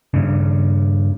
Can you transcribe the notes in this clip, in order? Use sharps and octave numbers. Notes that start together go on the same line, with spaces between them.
G2 C#3